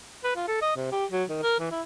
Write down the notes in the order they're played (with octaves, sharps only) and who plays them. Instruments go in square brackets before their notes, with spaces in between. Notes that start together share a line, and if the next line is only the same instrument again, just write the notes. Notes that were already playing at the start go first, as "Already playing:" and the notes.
[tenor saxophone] B4
F4
A4
D#5
C3
G4
F#3
D#3
A#4
E3
E4